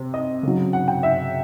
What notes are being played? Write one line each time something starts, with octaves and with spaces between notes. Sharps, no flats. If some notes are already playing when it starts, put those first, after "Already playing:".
Already playing: C3
D#5
C#3 F#3
F#5
G5
E5